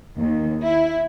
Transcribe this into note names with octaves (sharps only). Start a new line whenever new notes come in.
D#2
E4